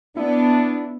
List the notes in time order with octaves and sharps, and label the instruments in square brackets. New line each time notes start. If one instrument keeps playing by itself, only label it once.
[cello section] B3 [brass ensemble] D4 [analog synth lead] E4